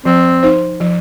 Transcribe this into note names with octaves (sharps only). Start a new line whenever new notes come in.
F3 C4
D#4 C5
F3